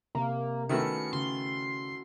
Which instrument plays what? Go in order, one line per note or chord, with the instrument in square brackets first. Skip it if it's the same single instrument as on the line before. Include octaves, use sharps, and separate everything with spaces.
[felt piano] C3 [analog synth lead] A#3
[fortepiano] D#3 A3 B3 [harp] C#4 E4 F#4 [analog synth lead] C#7
[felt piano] C#3 [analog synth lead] C6